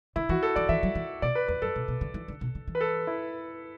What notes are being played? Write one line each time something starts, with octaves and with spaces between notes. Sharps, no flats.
D3 E4
E3 F#4
A4
E3 D5
E3 E5
F#3
E3
B2 D5
B4
E2 B4
F#2 A4
B2
B2
D3
E3
D3
B2
D3
E3
B4
A4
E4